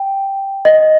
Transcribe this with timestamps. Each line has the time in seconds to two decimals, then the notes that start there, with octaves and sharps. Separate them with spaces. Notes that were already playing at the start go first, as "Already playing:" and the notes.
Already playing: G5
0.65 D#5